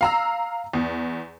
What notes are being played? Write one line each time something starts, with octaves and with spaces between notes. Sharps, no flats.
F5 A#5 E6
E2